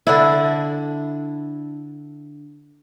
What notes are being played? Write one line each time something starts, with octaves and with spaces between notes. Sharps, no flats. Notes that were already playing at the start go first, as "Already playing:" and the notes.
D3 D4 E4